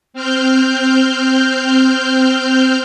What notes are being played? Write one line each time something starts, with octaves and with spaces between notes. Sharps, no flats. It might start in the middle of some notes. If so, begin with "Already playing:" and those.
C4 F6 G6